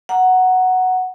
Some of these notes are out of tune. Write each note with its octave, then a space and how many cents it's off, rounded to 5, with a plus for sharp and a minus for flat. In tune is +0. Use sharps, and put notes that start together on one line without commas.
F#5 +0 A#5 +5